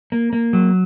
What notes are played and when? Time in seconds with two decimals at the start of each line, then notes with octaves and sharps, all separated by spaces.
0.12 A#3
0.33 A#3
0.53 F#3